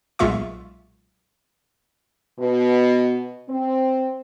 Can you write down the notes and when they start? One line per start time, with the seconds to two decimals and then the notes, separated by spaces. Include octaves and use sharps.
0.19 B1 A#2 G#3 F4 E5 C#6
2.39 B2
3.49 C4